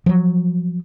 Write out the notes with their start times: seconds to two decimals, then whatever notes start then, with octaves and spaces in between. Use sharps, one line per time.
0.06 F3 F#3